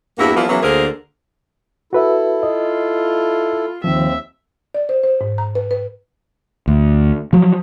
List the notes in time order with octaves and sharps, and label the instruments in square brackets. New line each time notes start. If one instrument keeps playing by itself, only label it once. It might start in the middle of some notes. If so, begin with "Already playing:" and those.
[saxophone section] E2 G2 A#3 E4 F#4
E3 F3 G3 A#3 B3 E4
C#3 E3 F#3 A#3 B3
D2 D3 A#3 G#4 A#4 C5
[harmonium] E4 A4 [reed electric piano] F#4 B4 E5
[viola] F4 [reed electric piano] D#5
[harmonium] D#2 C4 [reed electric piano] D#3 F3 [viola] E5
[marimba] D5
C5
C5
G#2
A#5
B4
B4
[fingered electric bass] D2
F3 F#3